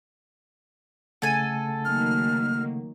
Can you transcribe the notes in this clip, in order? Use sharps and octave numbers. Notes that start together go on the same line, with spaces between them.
C#3 A3 A4 F#5 G#5
D#3 F#3 A#3 F6